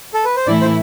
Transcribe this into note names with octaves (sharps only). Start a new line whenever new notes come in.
A4
B4
C5
A2 E3 A3 E4 D5
C5